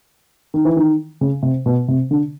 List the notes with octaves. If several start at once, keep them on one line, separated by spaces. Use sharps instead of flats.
D#3
E3
D#3
C#3
C3
B2
C3
D3